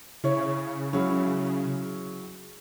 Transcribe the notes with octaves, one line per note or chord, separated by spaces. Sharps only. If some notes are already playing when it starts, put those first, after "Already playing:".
C#3 E4 C#5
F#3 G#3 C#4 E4